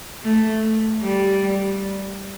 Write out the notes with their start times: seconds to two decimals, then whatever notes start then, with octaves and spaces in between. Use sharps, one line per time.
0.24 A3
1.02 G3